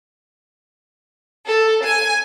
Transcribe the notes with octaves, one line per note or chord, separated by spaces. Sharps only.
A4
G#5